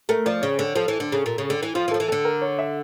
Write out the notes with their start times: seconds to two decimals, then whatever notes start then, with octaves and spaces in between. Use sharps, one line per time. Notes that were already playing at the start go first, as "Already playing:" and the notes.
0.09 A3 A#4
0.26 F3 D5
0.42 C#3 C#5
0.58 D3 C#5
0.75 F3 A4
0.88 E3
1.00 D3
1.12 C#3
1.26 A#2
1.38 C#3
1.50 D3
1.63 E3
1.75 F3 F4
1.88 E3
1.91 F3 A4
2.00 E3
2.08 D3 A4
2.25 A#4
2.42 C#5
2.59 E5